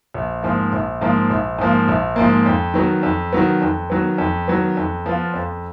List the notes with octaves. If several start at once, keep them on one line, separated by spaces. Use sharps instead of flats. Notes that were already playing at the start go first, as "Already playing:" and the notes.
A#1
G#2 F3 A#3
A#1
G#2 F3 A#3
A#1
G#2 F3 A#3
A#1
G#2 F3 A#3
F2
D#3 F#3 B3
F2
D#3 F#3 B3
F2
D#3 F#3 B3
F2
D#3 F#3 B3
F2
F3 B3 F4
F2